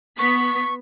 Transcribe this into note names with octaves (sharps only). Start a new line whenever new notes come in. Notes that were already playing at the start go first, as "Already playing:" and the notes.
B3 C#6 B6